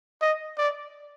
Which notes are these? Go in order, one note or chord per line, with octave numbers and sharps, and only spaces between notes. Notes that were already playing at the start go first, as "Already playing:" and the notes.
D#5
D5